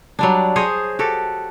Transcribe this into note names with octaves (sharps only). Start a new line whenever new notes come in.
F#3 G3 D4
G#4 C5 C#5 D#5
F#4 G4 A4